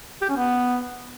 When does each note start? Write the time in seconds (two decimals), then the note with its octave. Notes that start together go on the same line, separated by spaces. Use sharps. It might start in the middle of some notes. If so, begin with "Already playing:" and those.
0.22 G4
0.29 C#4
0.37 B3